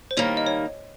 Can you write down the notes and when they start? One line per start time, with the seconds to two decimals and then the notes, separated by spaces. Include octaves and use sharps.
0.11 C5
0.17 D#3 G3 A#3 C#5
0.37 D#5
0.47 C#5